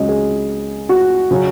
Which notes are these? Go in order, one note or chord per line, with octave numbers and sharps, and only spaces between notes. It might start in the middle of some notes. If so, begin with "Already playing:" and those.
Already playing: C#2 C#3 F#3 C#4 D#5
G#4
F#4
C#3 F#3 C#4